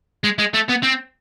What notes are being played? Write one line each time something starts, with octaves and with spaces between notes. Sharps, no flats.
G#3
G#3
A3
B3
C4